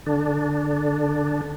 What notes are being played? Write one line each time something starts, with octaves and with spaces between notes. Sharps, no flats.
D3 D4